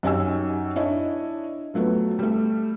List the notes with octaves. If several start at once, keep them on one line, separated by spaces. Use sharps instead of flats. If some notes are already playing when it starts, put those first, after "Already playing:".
F#2 D#4 G4 D#5 G#5 E6
D4 E4 C#5 D#5
F3 F#3 A3 B3
G3 A3